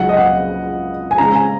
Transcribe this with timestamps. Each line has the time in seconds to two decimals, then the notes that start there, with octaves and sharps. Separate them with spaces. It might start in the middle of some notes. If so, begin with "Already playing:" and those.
Already playing: C#2 C#3 F#3 D#4 F#5
0.09 D#5
0.17 F#5
1.11 G#5
1.18 C#3 G#3 C#4 A#5
1.35 G#5